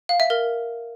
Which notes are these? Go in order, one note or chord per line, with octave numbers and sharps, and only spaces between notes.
F5
E5
A#4